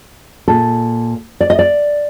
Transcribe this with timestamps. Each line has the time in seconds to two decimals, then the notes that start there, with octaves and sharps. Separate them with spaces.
0.48 A#2 A4
1.41 D5
1.50 D#5
1.59 D5